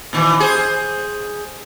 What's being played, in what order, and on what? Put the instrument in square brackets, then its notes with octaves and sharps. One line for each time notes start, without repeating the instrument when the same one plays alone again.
[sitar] A#2 D#3 E3
G#4 C5